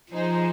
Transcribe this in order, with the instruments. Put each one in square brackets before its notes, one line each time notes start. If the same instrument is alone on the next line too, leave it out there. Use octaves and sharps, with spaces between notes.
[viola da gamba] F3 [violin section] D#4 G#4 C5